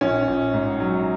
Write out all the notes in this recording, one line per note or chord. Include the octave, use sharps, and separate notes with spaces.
A#1 C#4
A#1
G#2
F#3